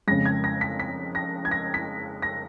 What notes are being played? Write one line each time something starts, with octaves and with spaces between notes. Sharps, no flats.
F2 C#3 G#3 A#6
G#6
A#6
B6
B6
A#6
G#6
A#6
B6
A#6